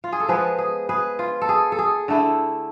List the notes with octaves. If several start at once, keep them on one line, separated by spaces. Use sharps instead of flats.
F4
G#4
A4
F3 G#3 B3 G#4 B4
G#4
G#4 B4
F4
A4
G#4
A4
G#4
D3 A3 E4